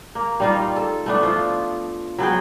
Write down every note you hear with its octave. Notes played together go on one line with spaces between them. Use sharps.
A#3
G3 D#4 F4
A4
A3 B3 D4
F3 F4
F#3 B3 G#4 G5